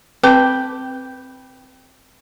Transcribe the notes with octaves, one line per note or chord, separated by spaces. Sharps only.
C4 B4 G5 A5 D6